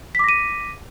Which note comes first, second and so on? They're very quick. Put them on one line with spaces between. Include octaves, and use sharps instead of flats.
B6 D6 A#6 D#7